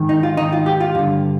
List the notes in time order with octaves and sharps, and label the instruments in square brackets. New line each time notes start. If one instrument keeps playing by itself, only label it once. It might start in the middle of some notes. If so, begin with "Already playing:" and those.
Already playing: [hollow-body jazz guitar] G#2 D#3
D#4
F4
G#2 D#3 D#4
F4
G4
F4
G2 D3